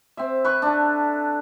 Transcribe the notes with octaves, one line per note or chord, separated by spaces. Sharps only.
C4 E5
B4 C#6
D4 A4